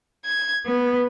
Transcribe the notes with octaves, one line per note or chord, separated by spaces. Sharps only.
G#6
B3